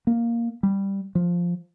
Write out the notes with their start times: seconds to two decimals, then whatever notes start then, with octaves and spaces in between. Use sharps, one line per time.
0.07 A#3
0.63 G3
1.15 F3